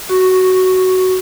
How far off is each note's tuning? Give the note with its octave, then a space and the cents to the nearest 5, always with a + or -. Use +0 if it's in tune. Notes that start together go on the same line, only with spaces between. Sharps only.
F#4 +10 C#6 +0